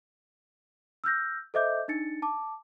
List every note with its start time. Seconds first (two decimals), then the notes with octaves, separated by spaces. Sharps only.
1.04 E6 F6 G6 A#6
1.54 A4 C5 D#5 E5 D6 G6
1.88 D4 D#4 A6 C#7
2.22 A5 D6